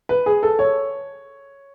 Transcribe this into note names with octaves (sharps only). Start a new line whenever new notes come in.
B4
G#4
A4
C#5